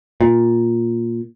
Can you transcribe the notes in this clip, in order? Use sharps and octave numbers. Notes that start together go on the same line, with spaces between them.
A#2